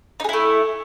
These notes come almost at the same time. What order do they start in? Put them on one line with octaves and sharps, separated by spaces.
D#4 G#4 E4 A3